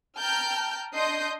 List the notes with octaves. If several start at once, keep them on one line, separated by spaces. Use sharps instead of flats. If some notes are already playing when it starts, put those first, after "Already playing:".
G5 A5 A#5 F6 G6
D4 D#5 C6 D#6 G6 C7